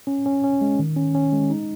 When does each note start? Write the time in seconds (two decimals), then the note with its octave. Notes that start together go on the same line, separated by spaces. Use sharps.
0.07 C#4
0.26 C#4
0.44 C#4
0.61 G#3
0.79 D#3
0.96 C#4
1.15 C#4
1.33 G#3
1.50 D#4